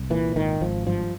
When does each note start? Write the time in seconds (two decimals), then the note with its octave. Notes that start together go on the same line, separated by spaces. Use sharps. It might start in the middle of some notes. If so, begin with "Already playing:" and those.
Already playing: C2
0.10 A#2 E3
0.35 G#1 D#3
0.61 G#1 F3
0.86 G2 F3